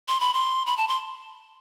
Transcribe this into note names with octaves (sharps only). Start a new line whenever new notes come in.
C6
B5
C6
B5
A5
C6